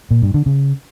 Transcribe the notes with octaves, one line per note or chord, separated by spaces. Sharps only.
A#2
G2
D3
C#3